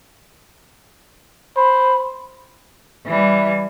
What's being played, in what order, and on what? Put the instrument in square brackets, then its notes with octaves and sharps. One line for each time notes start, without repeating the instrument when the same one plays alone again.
[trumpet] C5 [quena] B5
[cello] E3 G3